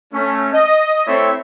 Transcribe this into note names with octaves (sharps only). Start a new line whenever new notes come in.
A3 C#4
D#5
A3 C4 E4 A4 C#5 E5